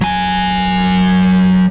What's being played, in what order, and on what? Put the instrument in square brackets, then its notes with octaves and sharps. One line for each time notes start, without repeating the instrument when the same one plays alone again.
[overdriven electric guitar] F#3 G#5